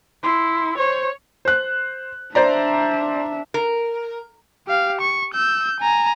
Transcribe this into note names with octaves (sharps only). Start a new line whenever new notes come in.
E4 C6
C5 C#5
C5 F#6
D4 C5 D5 E5 A#5
A#4
G4 F5
C#6
E6 G6
G#5 A#5